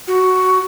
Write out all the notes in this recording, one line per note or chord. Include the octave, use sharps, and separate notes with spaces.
F#4